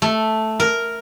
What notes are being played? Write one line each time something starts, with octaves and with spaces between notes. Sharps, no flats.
A3
A#4